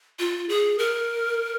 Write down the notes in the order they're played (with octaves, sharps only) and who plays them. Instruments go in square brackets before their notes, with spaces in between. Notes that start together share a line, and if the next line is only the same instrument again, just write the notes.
[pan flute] F4
G#4
A#4